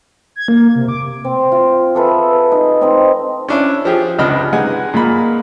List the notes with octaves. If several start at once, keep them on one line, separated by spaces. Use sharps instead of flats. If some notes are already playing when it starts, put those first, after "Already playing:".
G#6
A#3
C3
D6
C4
F4
G#4 A4 B4 E5
D#4
C4 D#4
C#4 D4 E4
F3 G4 G#4
C#2 C3 D4 D#5 B5 F6
G#3 D#4 B4 F#5 G#5
A#2 G#3 A#3 B5